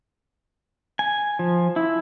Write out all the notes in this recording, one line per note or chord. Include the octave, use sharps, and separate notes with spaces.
G#5
F3
E4